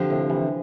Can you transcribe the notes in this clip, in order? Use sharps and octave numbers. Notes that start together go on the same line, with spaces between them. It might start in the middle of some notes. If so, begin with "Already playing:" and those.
Already playing: D3 F3 C4 G4
A2 C3
C3 E3